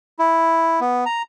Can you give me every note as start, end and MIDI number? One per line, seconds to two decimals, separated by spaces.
0.19 0.80 64
0.81 1.04 59
1.06 1.22 82